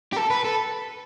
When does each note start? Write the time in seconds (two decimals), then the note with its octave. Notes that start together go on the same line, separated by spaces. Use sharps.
0.13 G4
0.17 A4
0.30 B4
0.45 A4